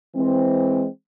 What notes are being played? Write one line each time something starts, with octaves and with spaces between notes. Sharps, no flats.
E3 G#3 C4